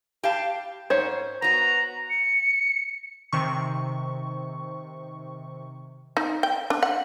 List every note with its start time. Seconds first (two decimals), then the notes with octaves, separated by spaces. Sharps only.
0.23 G4 F5 A5
0.90 G#2 C5 C#5
1.42 B3 F#4 A#5
2.10 C#7
3.33 C3 D#3 C#6
6.17 D#4
6.43 G5
6.70 D4
6.83 F#5